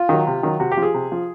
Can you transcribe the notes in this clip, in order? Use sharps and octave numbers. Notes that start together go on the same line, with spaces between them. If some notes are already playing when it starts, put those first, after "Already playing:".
Already playing: F4
D#3 F#3
C3
D#3 F#3
C3 F#4
G4
F3
G#4
C3
F3